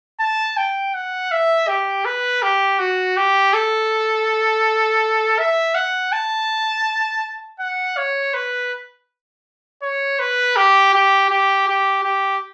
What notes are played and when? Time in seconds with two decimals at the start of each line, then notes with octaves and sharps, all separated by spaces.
0.20 A5
0.57 G5
0.94 F#5
1.32 E5
1.68 G4
2.05 B4
2.42 G4
2.79 F#4
3.17 G4
3.53 A4
5.38 E5
5.75 F#5
6.12 A5
7.60 F#5
7.97 C#5
8.34 B4
9.83 C#5
10.19 B4
10.56 G4
10.93 G4
11.30 G4
11.67 G4
12.04 G4